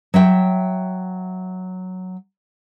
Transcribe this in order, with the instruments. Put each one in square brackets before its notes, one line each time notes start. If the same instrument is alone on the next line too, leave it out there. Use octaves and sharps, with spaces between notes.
[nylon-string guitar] F#3 E5 G5